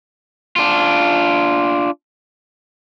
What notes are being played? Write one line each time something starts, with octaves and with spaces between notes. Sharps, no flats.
D4 F4